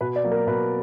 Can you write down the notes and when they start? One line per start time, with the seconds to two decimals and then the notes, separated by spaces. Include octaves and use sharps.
0.01 B2 B4
0.16 D5
0.24 F#3 A#3
0.31 A#4
0.47 B2 B4